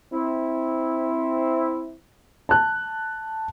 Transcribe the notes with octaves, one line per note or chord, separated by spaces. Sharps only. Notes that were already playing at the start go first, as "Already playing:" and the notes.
C4 E4
A5 F#6